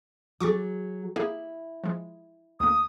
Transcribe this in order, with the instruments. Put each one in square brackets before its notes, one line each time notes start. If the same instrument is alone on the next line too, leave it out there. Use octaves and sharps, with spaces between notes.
[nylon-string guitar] F#3 G#4 [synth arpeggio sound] C#6 D6 A6
[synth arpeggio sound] A#3 G4 G#4 [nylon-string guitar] E4
[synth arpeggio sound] F3 G#3
[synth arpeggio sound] D2 A#3 [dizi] D#6